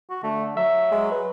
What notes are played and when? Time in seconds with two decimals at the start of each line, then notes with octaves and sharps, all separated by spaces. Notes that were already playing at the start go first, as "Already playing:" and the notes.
0.10 F#4
0.23 D3 A3
0.57 F#3 E5
0.92 G#3
1.11 B4